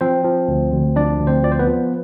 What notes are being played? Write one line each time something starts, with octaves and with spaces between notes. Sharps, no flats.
F3 C4 C5
F3
D2
D2
F3 D4 D5
D2
C4 C5
F3 D5
C5
B3 B4
F3